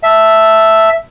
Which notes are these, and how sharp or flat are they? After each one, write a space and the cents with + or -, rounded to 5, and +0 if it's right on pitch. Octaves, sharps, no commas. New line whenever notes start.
E5 +0 A5 +0